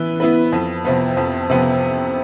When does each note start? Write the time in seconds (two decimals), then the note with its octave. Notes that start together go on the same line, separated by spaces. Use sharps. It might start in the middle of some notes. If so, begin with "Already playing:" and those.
Already playing: E3 B3 E4 B4
0.20 B3 E4 B4
0.53 F2
0.85 C3 F3 B3
1.17 F2
1.50 C3 F3 B3